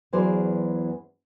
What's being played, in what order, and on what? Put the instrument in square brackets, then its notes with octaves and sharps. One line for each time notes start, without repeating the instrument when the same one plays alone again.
[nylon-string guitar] E2 E3 F#3 G#4 C5 D5